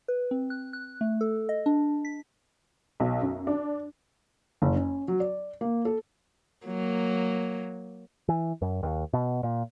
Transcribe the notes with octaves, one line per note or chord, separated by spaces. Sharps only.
B4
C4
F#6
F#6
A3
A4
D#5
D4
B6
B1
F#2
D4
F#1
C#4
F#3
D5
A#3
A4
F#3 A#3
E3
F#2
D#2
B2
A#2